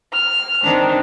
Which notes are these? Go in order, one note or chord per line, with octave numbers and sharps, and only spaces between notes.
F6
D#3 C4 D4